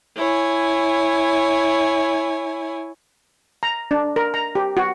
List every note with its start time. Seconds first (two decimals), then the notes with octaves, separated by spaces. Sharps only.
0.15 E4 C#5 G#5
3.63 A#5
3.91 D4
4.16 A#4
4.34 A#5
4.55 G4
4.77 F#4